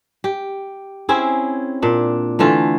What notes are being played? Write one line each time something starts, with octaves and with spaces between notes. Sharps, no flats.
G4
C4 C#4 E4 G#4
A#2 D4
D3 E3 A3 F4